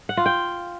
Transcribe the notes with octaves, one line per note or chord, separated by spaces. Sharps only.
F#5
F4
G5